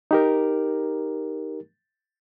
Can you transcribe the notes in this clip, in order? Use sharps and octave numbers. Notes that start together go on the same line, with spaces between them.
D#4 G4 A#4